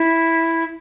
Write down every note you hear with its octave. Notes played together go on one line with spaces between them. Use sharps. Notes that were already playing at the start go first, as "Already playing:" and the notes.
Already playing: E4